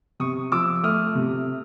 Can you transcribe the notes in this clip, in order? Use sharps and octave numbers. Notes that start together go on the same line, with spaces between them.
C3 C#6 D#6
F3 D6 E6
A3 D#6 F6
C3